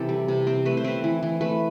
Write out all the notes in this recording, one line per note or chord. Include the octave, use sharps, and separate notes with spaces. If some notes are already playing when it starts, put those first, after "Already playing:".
Already playing: C3 E3 C4 G4 A4
G3
C3
C4
A3 B4
C5
C4 B4
E3
E3
A3 B4